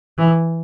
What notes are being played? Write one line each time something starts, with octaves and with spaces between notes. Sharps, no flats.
E3